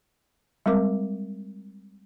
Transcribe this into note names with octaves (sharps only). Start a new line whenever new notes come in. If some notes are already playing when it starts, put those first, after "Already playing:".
G3 G#3 C4 A#4 D6